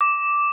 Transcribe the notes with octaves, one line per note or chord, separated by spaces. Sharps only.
D6